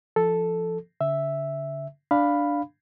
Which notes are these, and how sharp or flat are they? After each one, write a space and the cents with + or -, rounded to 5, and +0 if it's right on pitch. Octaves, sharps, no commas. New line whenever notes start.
F3 -25 A4 +0
D3 -45 E5 +0
D4 +0 F5 +0 B5 +0